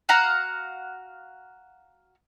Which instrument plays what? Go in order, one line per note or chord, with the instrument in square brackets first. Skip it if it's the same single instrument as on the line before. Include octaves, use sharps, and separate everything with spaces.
[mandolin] F#4 F5 F#5 A#5